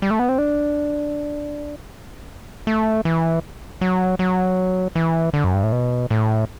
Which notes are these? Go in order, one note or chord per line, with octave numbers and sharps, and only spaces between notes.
G3
A3
B3
C4
D4
A3
E3
F#3
F#3
E3
D3
F#2
G2
A2
B2
A2